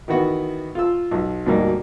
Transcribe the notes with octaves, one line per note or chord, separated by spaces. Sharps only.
D#3 E3 B3 F#4
F4 E6
B1
D2 G#2 B2 G3 A#3